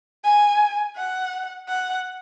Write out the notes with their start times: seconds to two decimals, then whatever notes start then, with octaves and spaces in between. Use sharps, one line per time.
0.24 G#5
0.96 F#5
1.68 F#5